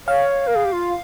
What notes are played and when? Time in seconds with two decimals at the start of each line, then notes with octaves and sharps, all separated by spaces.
0.07 C#5 F5
0.47 A#4
0.55 G#4
0.65 G4
0.73 F4